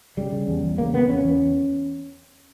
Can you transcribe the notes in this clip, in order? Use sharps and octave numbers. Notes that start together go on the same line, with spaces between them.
C#3 G3
C#3
E2
E2
C#3 A#3
C#3 B3
E2 C#4
E2